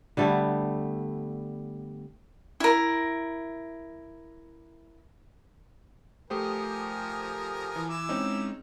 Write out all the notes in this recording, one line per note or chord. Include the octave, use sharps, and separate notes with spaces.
D3 G3 A3 B3
E4 A#4
F3 A3 G4 A#4 C5 G#5 D#6
E3
E4 D6 E6
G#3 C4 C#4 D#4